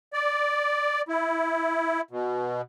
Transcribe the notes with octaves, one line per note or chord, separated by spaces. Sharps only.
D5
E4
B2